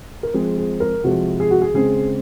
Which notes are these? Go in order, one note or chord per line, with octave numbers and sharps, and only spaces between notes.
A#4
F3 G#3 C4 G#4
G#4
A#4
C3 F3 G#3 F#4
G#4
F#4
G#4
C#3 G#3 C4 G#4